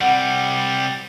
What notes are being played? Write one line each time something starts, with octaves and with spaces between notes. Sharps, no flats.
C2 G3 F#5